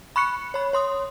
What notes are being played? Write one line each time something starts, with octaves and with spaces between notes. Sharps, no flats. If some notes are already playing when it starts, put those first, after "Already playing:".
B5 C#6 F#6 C#7
C#5 B5
C#5 C6 D#6